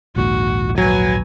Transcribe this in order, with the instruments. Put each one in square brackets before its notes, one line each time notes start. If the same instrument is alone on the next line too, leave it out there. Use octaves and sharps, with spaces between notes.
[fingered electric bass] A#1 D#2 G#2 [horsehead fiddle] F#4
[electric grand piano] F#3 [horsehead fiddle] B4 G#5